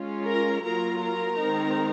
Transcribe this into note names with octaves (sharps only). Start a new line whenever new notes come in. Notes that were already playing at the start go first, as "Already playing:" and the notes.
Already playing: G#3 C#4 F4
A#4 A#5
F#3 A#3 F4 A#4 A#5
A#4 A#5
D#3 G#3 C4 D#4